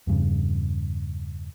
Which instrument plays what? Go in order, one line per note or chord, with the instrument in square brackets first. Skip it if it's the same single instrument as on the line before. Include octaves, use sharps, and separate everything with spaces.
[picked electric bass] E2 G2 C#3